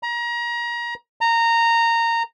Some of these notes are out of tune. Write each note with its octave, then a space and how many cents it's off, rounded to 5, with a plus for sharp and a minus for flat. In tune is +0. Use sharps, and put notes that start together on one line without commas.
A#5 +30
A#5 -15